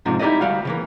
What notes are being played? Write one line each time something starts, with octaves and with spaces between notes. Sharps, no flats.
G#2 C3 F3 D4 D#4
D#4 E4 G4 A4 D5 D#5
D2 G3 F#4 F5
C#3 E3 A#3